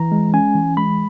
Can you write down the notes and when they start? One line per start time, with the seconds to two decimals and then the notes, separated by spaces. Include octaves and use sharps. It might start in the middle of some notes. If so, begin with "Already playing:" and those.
Already playing: E3 A#5
0.12 G#3
0.33 C#4 G#5
0.55 E3
0.77 G#3 B5